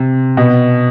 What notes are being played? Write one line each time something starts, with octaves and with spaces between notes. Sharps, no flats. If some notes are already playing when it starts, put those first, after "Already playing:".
Already playing: C3
B2